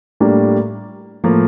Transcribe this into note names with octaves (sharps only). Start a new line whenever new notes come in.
A2 G3 A#3 D4
A2 F3 A#3